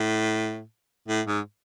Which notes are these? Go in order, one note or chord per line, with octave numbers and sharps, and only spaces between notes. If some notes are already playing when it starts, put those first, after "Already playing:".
Already playing: A2
A2
G#2